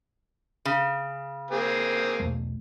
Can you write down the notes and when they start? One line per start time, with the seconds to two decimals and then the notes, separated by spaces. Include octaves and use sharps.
0.65 C#3
1.51 A#3 C4 G#4
2.20 B1 E2 A3